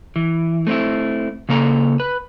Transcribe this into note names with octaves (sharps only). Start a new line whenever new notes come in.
E3
A3 C4 D#4 E4
C#3 A#3 A4 A#5
B4